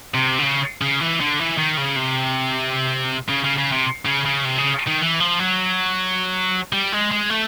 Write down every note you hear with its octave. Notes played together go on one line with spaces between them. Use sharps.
C3
D3
C#3
C#3
E3
D3
E3
D#3
C#3
C3
C#3
C#3
C#3
C3
C#3
C#3
C3
C#3
D#3
E3
F3
F#3
G3
G#3
G#3
A3